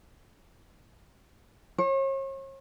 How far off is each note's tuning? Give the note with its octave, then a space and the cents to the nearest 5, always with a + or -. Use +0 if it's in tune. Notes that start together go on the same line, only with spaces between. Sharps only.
C#5 -40